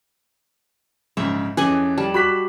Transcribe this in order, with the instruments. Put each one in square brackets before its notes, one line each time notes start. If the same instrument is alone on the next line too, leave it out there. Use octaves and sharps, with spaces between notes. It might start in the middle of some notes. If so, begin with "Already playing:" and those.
[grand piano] A#1 G#2 C#3 [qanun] E5
[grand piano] F2 E3 [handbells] C#4 [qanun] G#4 D#5 G#5
[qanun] G3 [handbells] A5
[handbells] F#4 G4 [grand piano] B5 F#6 B6